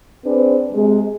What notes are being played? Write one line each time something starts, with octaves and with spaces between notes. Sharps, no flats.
C4 D4 G#4 B4 C5
C3 G#3